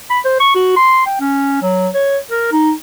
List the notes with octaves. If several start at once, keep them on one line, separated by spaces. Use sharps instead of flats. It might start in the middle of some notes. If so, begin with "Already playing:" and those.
B5
C5
C#6
F#4
C6
G5
C#4
F#3
C#5
A#4
D#4